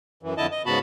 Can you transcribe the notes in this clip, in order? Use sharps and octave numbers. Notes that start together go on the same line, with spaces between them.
F#2 E3
F2 D3 E4 D#5 A5
D#5
G#2 C#3 B3 F#4 A5 B5